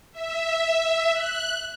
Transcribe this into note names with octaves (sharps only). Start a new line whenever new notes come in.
E5
F#6